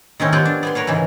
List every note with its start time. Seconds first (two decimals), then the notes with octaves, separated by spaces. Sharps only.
0.20 D#3 C4 C#4 E4
0.32 B3 C4 F4 G4 F#5 G#5
0.45 D4
0.63 B3 G#5 C6
0.75 A#4 B4 C#5 F5
0.87 G#2 C#3 E3